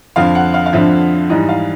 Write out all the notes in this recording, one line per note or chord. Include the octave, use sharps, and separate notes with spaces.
F2 D3 F3 F5
F#5
F5
F5
F2 D3 F3 E5
G#2 E3 G3 D#5
F5